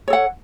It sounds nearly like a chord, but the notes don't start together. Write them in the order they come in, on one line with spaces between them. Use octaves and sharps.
C#5 A4 F#5